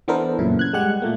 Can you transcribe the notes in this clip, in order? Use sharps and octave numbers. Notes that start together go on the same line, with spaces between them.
E3 B3 D4 A4 A#4 C5
F#2 A#2 C#3 E4
F#6 G#6
G3 G#3 G4 F#5 F#6
A#2 A3 A#3